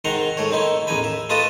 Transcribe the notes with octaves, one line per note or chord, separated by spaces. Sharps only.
G#2 D#3 C4 F#5 A#5 C6
G#2 A3 C#5
D#3 C4 D#4 E4
A1 E2 D#4 A#4 G#5 B5
E5
A3 F4 B4 D#5 A5 D#6